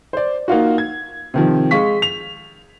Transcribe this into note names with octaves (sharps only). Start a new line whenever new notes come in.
C5 D5
A#3 D#4 F4 F#4
G#6
C3 D#3 F3
G#3 F5 C#6 B6
F7